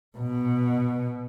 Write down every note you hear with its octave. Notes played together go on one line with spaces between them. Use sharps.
B2